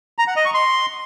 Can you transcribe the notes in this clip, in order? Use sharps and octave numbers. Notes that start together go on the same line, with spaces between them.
A#5
F#5
D#5
C#6
C6